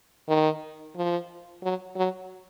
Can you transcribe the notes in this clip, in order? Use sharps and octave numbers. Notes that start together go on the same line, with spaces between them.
D#3
F3
F#3
F#3